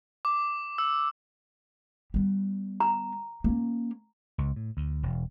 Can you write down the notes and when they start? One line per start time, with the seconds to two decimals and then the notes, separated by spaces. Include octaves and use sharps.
0.25 D6
0.78 E6
2.14 G3 B3
2.80 A#5
3.44 A#3 C#4
4.38 C#2
4.56 A2
4.77 D2
5.03 E1